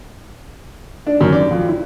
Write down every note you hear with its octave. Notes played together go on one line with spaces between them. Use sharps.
D4
F#2
D5
F2
E4